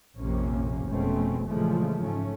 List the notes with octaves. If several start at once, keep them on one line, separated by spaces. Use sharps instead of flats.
A#1 F2 C3 A#3 C#4
F1 B2 G#3 A3 C4 C#4
A#2 C#3 E3 F3 G#3 A3
G#2 A3 C#4